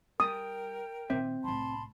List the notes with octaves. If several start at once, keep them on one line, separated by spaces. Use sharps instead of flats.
G3 A#4 G5 D#6
A#2 D#3 C4 E5
C2 A2 A5 B5 C6